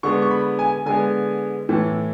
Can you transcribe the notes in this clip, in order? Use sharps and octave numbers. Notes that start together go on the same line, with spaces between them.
D3 G#3 B3 C#6
C#6
B5
G#5
D3 G#3 B3 G#5
A2 E3 A3